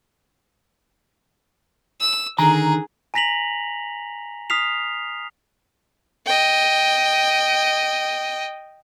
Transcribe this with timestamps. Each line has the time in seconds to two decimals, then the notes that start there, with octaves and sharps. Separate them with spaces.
2.00 E6
2.39 D3 D#3 G#4 A#5
3.14 G#5 A#5 A#6 B6 F7 F#7
4.50 D#6 F6 B6 C7 F7
6.26 D#5 G5